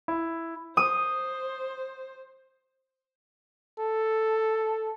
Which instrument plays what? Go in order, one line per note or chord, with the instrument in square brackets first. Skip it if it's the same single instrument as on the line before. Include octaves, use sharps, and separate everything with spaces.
[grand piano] E4
[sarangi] C5 [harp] D#6
[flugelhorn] A4